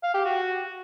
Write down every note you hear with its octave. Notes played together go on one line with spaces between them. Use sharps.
F5
G4
F#4